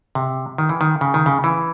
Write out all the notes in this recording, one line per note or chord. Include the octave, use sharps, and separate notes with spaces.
C3
D#3
E3
D#3
C#3
D#3
C#3
E3